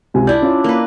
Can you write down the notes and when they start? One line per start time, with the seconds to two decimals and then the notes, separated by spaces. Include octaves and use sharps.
0.14 C#2 C3 G#5
0.27 D4 E4 D5 G6
0.42 C#4 F4
0.64 A#3 B4